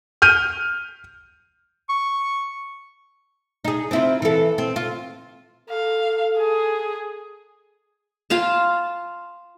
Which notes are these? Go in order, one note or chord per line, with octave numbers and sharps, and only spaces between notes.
F6 G6 D#7
C#6
D#4 G#4
C4 E4 F4
E3 A4
C4
F4
A4 F5
G#4
F4 F5 A5